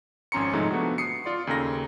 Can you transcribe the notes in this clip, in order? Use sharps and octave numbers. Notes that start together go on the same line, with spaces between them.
G#1 F2 C#4 A#5 C6 C#7
G#2 C3 F3 G#3 A3 D#4
F3 A3 B3 D4 F#4
D#6 C7 C#7
F4 D5 C6
D#2 C#3 A4 A#5 A#6